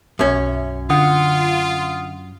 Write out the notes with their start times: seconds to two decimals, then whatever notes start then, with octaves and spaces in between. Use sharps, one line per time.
0.19 B1 F#2 C#4 E5
0.90 D3 F4 F#5 D#6